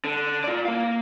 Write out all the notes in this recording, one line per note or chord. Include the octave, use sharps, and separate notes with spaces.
D3
F4 D5
A#3 F5